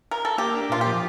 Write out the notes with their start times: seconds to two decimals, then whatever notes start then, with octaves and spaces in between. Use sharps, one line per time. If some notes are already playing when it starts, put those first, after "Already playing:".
0.11 A#4
0.25 A4
0.38 A#3 G4
0.54 D4
0.70 A#2 F4
0.81 G4
0.86 F3